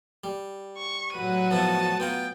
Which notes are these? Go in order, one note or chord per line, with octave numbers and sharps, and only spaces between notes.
G3
C#6
A2 F#3 F#4 B4 D#7
F3 B3 E4 A5
B3 F4 G5 A#5